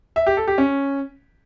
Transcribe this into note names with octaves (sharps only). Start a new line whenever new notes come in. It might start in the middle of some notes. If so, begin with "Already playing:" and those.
E5
G4
A4
G4
C#4